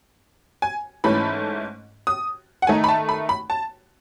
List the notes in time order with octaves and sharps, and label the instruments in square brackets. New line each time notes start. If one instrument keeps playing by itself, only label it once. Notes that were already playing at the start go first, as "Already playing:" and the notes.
[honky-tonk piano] G#5
G#2 E3 A3 C#4 B5
D#6
F#5
D#3 A3 D#4 G#5
B5
A5
B5
B5
A5